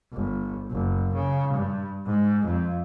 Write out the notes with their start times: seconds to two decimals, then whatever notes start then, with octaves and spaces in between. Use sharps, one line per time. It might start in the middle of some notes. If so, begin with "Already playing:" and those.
0.13 G1
0.70 F#1
1.14 C#3
1.54 G2
2.06 G#2
2.45 F2